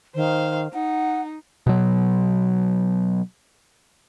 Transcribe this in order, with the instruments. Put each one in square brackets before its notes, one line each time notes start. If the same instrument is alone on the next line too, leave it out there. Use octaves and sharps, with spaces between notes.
[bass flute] D#3 [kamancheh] C5 F5
[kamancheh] D#4 [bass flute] F#5
[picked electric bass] B2 F#3